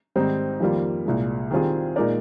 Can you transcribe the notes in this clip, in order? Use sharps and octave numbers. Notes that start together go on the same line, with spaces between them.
G#2 D#3 G3 C4 D#4
F2 D#3 G3 A#3 F4
C2 A#2 G#3
D#3 G3 C4 F4 G#4
A#2 G#3 D#4 A#4 D5